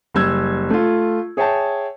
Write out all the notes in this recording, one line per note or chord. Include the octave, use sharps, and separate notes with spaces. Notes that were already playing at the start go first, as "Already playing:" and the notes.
F#1 G3 E6 G#6
A3 F4
G#4 C#5 E5 G5 A5